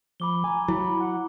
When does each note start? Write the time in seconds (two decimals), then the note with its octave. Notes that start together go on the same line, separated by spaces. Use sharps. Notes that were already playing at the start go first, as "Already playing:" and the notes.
0.20 F3 B5 D6 G7
0.44 G#5 A#5 D6
0.68 F#3 E4 B5
1.00 F#5